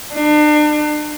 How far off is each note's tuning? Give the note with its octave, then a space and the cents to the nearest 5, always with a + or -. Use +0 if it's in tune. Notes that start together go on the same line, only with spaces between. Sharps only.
D4 +40